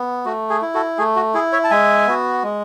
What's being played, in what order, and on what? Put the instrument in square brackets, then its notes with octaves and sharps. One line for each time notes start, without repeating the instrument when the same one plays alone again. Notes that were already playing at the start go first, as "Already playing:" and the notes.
Already playing: [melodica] B3
A3 F#4
G#4
E4
F#4 A4
A3 G#4
F#4
E4 G#4
C#5 E5
A5
G#3 E5 G#5
B3 F#4
G#3